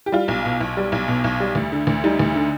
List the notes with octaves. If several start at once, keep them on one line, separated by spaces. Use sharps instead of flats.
G4
G3 F4
B1
B2
B1
G3
B1
B2
B1
G3
D2
D3
D2
G3 D#4
D2
D3